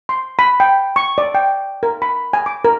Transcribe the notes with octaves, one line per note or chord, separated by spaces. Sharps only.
C6
B5
G5
C#6
D5
G5
A#4
B5
G#5
D6
A#4